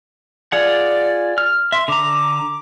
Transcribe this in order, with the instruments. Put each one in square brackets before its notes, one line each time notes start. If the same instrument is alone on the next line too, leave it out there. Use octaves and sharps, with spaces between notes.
[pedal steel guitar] F4 G#4 F#5 [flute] D5
[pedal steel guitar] F6
[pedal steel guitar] E5 [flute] C6
[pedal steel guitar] D3 A#5 [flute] D6